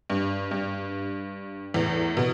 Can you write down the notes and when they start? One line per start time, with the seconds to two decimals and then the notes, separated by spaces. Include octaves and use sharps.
0.10 G2
0.51 G2
1.74 E2 A2
2.17 B2